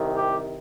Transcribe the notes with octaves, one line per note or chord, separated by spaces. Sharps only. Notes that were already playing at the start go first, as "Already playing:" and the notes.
Already playing: C2 C3 D#3
G4